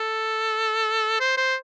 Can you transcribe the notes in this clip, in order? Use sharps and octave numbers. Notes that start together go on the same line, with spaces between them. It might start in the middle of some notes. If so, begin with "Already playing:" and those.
Already playing: A4
C5
C5